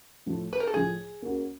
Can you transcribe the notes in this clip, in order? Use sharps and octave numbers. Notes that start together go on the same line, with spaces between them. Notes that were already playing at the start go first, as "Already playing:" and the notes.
A2 F3 A3
B4
A#4
A4
A2 F3 A3 G#4
A#3 C#4 F#4